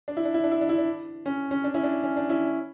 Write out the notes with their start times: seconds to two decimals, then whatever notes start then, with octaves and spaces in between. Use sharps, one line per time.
0.08 D4
0.17 E4
0.25 D4
0.34 E4
0.44 D4
0.52 E4
0.61 D4
0.69 E4
0.78 D4
1.26 C#4
1.51 C#4
1.64 D4
1.74 C#4 E4
1.83 D4
2.04 C#4
2.17 D4
2.29 C#4 E4